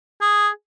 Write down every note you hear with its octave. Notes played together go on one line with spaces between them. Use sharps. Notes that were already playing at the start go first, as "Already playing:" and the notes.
G#4